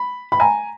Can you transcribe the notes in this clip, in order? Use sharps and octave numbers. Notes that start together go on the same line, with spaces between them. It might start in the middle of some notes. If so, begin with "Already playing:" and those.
Already playing: B5
B5
G#5 A#5